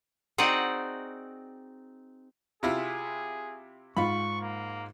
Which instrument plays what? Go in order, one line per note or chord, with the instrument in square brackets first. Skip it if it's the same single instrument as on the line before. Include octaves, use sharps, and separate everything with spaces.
[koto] C4 D#4 F#4 G#4 D5 F#5
[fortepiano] C3 E4 F4 [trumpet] G#4
[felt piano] G#2 F4 [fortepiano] B5 [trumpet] C#6
[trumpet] A#3